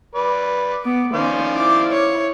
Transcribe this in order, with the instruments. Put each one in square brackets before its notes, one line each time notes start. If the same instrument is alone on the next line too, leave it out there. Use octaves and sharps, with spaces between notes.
[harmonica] B4 D5
[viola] B3 D6
[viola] D#3 C#4 [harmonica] C5 D5 F5
[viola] E4 [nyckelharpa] D6
[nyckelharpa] C#5